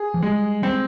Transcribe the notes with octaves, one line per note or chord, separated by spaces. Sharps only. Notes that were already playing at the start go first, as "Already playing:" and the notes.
Already playing: G#4
F3
G3 G#3
G3 C4